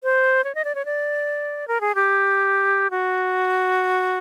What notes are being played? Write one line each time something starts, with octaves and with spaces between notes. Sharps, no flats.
C5
C#5
D#5
D5
C#5
D5
A#4
G#4
G4
F#4